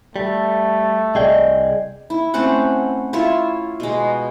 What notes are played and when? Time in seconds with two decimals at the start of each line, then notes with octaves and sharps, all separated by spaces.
0.16 G3 A3
1.15 C2 G#4 D5 D#5 G5
2.10 E4
2.34 A3 C4 C#4 F#5
3.13 E4 F4 C#5 E5
3.80 B2 G#3